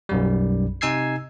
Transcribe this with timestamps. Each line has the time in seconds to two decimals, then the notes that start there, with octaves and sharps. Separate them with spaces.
0.09 B1 F#2 G3
0.81 C3 D#4 G#5 E6 G#6 C7